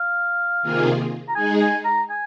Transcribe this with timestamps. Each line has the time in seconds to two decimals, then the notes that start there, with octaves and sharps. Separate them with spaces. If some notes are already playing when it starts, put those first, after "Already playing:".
Already playing: F5
0.62 C3 D#3 A#3 F4 G#4
1.28 A#5
1.35 G#3 D#4 G#4 G#5
1.61 G#5
1.85 A#5
2.10 G#5